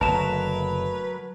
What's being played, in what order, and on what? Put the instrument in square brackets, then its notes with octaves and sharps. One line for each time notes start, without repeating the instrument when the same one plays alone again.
[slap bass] F#1 D3 A3 [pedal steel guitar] F#3 A#4 [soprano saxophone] B4 [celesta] A5 E7